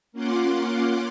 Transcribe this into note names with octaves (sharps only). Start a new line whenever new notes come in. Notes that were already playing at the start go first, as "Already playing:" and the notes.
A#3 C#4 F4 F#5 C6 D6